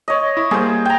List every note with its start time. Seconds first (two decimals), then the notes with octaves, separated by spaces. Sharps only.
0.08 C#5 D#5
0.37 E4
0.51 G3 A#3 G#4 C5
0.85 G5 A#5